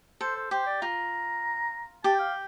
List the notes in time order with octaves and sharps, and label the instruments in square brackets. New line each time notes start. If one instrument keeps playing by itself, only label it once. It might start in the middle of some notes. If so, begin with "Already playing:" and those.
[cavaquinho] A4 [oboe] C5
[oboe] C5
[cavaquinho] G4 [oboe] C5
[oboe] D5
[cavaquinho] F4 [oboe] A#5
[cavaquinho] G4 [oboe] A5
[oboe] G5
F5